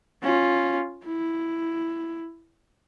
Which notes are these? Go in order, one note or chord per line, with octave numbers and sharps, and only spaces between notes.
C#4 F4
E4